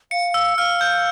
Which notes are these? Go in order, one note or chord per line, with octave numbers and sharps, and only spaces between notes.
F5 C#7
E6
F5 F6
G6